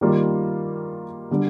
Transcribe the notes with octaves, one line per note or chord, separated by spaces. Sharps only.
D#3 G3 A#3 F4
D3 G3